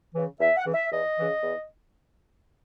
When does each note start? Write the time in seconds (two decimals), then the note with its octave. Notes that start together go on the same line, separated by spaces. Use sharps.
0.14 C#3 E3
0.39 E2 E5
0.57 F#5
0.66 C#3 E3
0.74 E5
0.92 E2 D#5
1.17 C#3 E3
1.43 E2